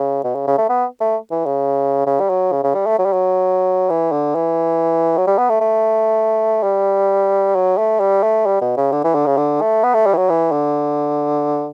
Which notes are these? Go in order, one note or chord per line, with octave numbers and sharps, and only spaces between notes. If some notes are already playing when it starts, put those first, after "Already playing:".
Already playing: C#3
B2
C#3
C#3
A3
B3
A3
E3
C#3
C#3
G3
F#3
C#3
C#3
G3
A3
F#3
G3
F#3
E3
D3
E3
F#3
G3
B3
A3
A3
G3
F#3
A3
G3
A3
G3
B2
C#3
D3
E3
D3
C#3
D3
A3
B3
A3
G3
E3
F#3
E3
D3